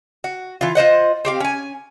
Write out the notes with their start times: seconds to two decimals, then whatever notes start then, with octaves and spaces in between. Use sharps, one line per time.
0.24 F#4
0.61 E3 F4
0.75 F4 C5 D#5 F#5
1.25 C4 G4 F5
1.40 C#4 G#5